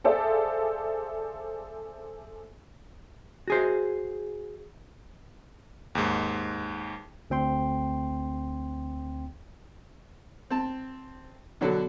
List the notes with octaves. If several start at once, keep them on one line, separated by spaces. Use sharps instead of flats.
G#4 A4 C5 D5 E5 F5
F#4 G#4 C5
D#2 G#2
D2 C4 G5 C6
C4 A5
B2 D3 F#3